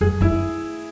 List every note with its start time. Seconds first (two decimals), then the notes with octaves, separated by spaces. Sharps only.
0.01 F#2 G#4
0.21 F#2 E4